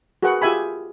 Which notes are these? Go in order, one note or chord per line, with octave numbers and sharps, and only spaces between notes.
F#4 G#4 A#4 B4 F#5 C#6
F4 G4 G#4 E5 G#5 B5